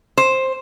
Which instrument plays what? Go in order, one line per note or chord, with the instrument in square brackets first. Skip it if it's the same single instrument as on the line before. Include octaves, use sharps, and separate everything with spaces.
[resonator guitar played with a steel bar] C5